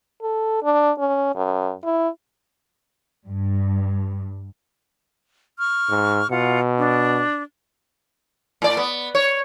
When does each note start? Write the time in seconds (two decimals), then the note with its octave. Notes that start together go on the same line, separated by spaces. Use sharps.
0.22 A4
0.63 D4
0.98 C#4
1.35 F#2
1.84 E4
3.27 G2
5.57 C#6 F6
5.89 G#2
6.30 B2 F4 F#5
6.78 D4
8.62 A2 D5
8.77 B3
9.15 C#5